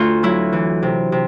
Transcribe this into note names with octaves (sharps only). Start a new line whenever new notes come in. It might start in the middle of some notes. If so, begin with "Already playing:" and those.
Already playing: D2 F4
F#3 E4
E3
C3
C3